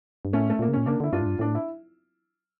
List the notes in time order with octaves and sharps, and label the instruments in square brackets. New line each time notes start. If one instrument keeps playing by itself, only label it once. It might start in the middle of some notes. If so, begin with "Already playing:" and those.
[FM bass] G2
[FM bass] A2 [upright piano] A3 C#4
[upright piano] A3
[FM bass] A#2 [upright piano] A#3
[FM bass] C#3
[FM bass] A#2 [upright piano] C#4
[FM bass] C#3 [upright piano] A#3 D4
[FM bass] D3 [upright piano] E4
[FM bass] G2 [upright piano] D4 F4
[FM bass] A2
G2
[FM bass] A2 [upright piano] D4
[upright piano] E4